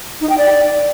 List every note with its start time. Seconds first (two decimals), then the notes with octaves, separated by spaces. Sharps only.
0.21 D#4
0.29 G5
0.38 D5